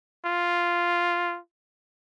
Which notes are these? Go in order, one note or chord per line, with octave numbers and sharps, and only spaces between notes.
F4